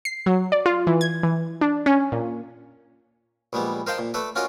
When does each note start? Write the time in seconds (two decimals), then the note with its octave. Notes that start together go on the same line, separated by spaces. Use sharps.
0.05 C7
0.26 F#3
0.52 D5
0.66 F4
0.87 E3
1.01 G#6
1.23 E3
1.61 D4
1.86 C#4
2.12 A#2
3.53 A#1 G3 G#3 B3
3.87 A#4 C5 D#5 F5 G5 A5
3.98 A#2
4.14 A3 A4 B4 D5
4.36 C#4 F4 F#4 A#4 D5 D#5